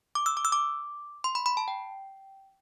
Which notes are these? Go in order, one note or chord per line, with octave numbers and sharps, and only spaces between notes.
D6
E6
D6
E6
D6
C6
B5
B5
A5
G5